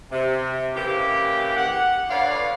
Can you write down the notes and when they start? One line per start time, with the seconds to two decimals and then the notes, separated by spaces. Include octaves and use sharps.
0.12 C3
0.74 C#3 E3 A#3 G4
1.57 F#5
2.09 D3 F4 B4 C#5 D5 F5